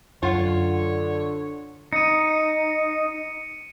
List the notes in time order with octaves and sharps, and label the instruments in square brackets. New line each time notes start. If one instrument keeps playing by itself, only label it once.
[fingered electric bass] F#2 [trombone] D3 [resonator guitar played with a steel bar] F4 F#5 [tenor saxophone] C#5
[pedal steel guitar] D#4 [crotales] C#7 D#7